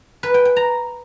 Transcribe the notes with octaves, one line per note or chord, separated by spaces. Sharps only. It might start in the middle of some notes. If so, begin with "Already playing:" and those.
B4
G5
G5
A#5